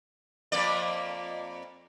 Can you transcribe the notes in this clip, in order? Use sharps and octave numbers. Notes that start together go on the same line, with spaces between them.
F2 A#3 D5